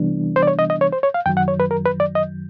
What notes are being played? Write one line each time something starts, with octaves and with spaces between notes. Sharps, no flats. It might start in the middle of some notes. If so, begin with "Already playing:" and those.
Already playing: C3 E3 G3 B3 D4
C5
D5
C#5
D#5
D#5
C#5
C5
C#5
F5
F#2 D#3 F#3 G5
F#5
C#5
B4
A#4
B4
D5
D#5